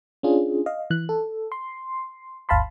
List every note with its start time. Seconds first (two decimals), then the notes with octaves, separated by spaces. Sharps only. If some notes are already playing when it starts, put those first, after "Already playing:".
0.23 C#4 D4 F4 G#4
0.66 D#5 F5
0.90 E3 F#6
1.09 A4
1.52 C6
2.49 G1 D2 F5 A5 B5 C6